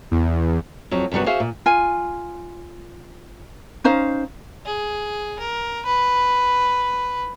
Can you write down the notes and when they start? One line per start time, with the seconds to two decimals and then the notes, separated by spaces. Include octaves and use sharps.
0.11 E2
0.91 F2 F#3 C4
1.12 F#2 C3 G3 B3 F#4
1.26 F#4 G#4 C5 E5 F5
1.40 A#2
1.66 F4 G#5
3.84 C#4 D#4 C5 F5
4.66 G#4
5.39 A#4
5.85 B4